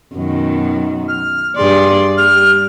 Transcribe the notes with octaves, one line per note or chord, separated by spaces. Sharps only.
F#2 B2 D#3
F6
G2 G#4 D5 C6
G3 F6